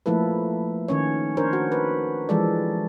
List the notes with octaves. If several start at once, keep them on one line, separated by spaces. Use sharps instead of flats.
F3 A3 A#3 E4 A4 B4
D#3 C#4 C#5
D4 A#4 C5 C#5
F#4
B4
E3 F3 G#3 A4 D5